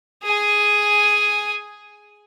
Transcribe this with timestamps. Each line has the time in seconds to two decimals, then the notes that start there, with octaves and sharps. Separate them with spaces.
0.23 G#4 G#5